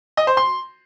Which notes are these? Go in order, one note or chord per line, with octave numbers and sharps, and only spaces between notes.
D#5
C5
C6